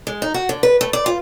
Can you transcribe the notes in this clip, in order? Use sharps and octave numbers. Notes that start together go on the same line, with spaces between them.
G#3
D#4
F#4
D3
B4
A3
D5
F4